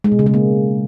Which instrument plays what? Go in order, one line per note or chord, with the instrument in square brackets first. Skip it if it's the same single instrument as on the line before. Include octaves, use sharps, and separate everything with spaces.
[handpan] G#3
B2
C#3
G#3
A#3